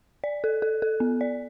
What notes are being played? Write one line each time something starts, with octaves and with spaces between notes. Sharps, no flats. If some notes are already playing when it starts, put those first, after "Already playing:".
D5
A4
A4
A4
B3
D5